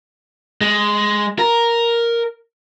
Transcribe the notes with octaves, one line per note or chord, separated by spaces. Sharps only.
G#3
A#4